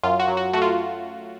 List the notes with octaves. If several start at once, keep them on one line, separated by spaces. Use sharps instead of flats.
F#2 F4
F#4
F#3
F#4
A3 F#4
F4